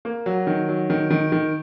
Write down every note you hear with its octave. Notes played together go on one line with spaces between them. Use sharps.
A#3
F#3
D#3
F#3
D#3
D#3
D#3